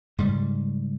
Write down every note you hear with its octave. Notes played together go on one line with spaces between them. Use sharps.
G#2 C#3 G3